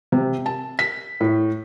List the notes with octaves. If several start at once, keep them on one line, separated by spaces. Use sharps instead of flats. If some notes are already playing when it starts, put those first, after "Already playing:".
C3
A5
B6
A2